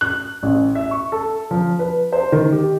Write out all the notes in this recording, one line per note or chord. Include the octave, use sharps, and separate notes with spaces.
F#6
A1
E5
C#6
A4
F3
B4
C5
D#3
G4